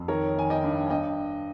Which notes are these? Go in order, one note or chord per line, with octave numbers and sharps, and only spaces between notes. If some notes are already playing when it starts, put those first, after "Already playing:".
Already playing: F2
D#3 A#4 C#5
D#3 G#5
D#5 G5
G2
G#5
G2 D#5 G5